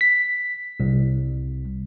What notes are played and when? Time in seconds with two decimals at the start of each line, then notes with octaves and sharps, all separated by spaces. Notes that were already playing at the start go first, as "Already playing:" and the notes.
0.01 B6
0.80 C2